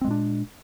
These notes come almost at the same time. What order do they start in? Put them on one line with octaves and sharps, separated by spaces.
C4 G#3 A#2 D4